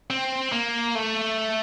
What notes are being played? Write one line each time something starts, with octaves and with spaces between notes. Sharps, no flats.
C4
A#3
A3